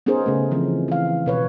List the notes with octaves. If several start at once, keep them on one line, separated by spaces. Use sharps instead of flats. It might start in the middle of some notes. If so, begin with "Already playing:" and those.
B3 C#4 D#4 G#4 A#4 C5
C#3 A3
E3 F3 C4
E3 F5
B2 B4 C#5